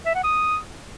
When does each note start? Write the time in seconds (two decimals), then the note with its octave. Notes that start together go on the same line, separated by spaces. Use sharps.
0.06 E5
0.15 F#5
0.24 D#6